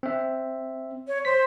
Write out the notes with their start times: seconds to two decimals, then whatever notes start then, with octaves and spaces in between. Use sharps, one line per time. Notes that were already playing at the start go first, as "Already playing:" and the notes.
0.03 C4 E5
1.08 C#5
1.25 C5 B6